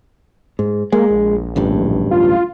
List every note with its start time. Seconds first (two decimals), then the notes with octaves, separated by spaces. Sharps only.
0.59 G#2
0.92 G#3 A#3
1.10 A#1
1.56 D1 A1 G2
2.11 F4